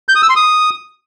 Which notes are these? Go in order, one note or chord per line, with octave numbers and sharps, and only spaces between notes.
G6
D#6
E6
C6
D#6